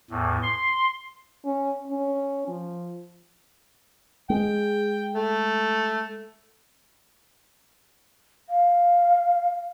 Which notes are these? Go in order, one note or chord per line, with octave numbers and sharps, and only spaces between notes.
E2 A2
C6
C#4
C#4
F3
G#3 G5
A3
F5